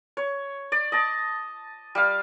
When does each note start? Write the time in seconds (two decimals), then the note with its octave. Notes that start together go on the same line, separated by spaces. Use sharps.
0.17 C#5
0.72 D5
0.92 D#5 A5
1.95 G3 F5